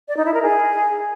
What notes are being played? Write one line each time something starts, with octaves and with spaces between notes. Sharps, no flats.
D5
D#4
E4
A#4
G#4